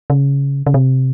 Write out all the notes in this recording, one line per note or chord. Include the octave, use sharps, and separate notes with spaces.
C#3
C#3
C3